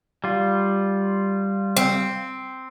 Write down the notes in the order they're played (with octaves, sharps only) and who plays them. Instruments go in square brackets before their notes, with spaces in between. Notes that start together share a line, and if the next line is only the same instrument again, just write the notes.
[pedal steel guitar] G3 F4
[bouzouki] C4